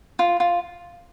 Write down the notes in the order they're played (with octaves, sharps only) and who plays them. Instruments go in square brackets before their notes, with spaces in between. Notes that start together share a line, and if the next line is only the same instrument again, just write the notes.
[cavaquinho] F4
F4